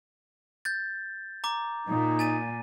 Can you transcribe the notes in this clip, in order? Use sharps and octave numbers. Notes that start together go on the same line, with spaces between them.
G6 A6
A#5 D6
A#2 D#4
G#5 A6 D#7